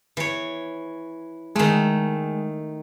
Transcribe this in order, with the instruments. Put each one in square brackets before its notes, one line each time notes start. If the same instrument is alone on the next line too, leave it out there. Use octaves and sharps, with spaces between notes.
[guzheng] E3 C#5
[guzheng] D#3 A3 [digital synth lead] G#3